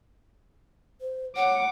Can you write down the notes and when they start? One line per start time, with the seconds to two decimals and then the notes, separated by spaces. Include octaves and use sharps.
1.01 C5
1.36 C#5 F#5 D6